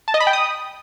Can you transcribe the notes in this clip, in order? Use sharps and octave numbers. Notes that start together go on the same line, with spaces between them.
A5
D#5
B5
G5
D#6